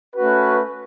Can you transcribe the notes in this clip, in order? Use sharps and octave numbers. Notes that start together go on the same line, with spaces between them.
A3 C#4 F#4 B4